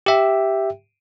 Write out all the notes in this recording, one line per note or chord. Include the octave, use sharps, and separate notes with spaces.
G4 E5 G5